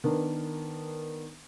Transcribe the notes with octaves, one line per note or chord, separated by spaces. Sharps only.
D#3 B3 D4 A#4